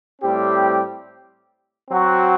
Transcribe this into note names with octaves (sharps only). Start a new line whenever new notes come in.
A2 G3 C4 G4
F#3 C4 F#4